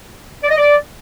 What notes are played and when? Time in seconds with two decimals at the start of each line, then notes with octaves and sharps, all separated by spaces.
0.44 D5
0.51 D#5
0.57 D5